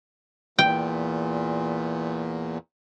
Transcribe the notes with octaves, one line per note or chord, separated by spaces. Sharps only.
E2 A#2 G5